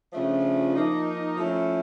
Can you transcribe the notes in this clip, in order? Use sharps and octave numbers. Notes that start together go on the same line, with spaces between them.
C#3 F3 A3 D4 F4
F3 A#3 D#4
F3 A3 C#4 E4